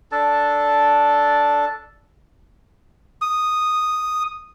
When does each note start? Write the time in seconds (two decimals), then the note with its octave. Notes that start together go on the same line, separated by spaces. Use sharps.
0.12 D4 A4 A5
3.22 D#6